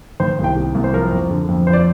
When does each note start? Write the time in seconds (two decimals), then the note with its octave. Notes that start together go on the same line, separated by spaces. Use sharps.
0.20 D#3 C5
0.39 C2
0.44 G5
0.56 C3
0.75 C2
0.84 C5
0.93 F3 A#4
1.11 F2
1.30 D3
1.49 F2
1.67 F3 C5
1.73 D5